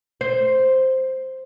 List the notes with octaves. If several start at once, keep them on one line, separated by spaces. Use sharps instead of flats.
C5